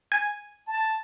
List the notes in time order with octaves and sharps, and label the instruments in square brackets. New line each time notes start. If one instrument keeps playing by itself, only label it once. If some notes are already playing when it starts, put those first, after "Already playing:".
[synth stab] G#5
[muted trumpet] A5